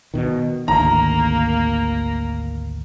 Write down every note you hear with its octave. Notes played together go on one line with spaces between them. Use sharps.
B2 D#3
G#1 D2 D#3 A#3 A#5